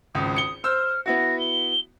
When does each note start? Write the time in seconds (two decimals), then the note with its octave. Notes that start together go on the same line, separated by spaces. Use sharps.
0.15 G#1 C#2 D#6
0.36 C#7 G7
0.64 C5 E6 F6
1.06 B3 E4 F#4 A#6
1.39 G7